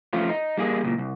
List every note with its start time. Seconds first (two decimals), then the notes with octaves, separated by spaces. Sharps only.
0.13 F3 A3 C#4 F4
0.29 D#4
0.57 G3 A#3 G#4
0.83 C#2 A#2
0.98 C2